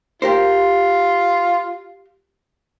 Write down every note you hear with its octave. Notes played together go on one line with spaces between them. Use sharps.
F4 G4 A#4 C5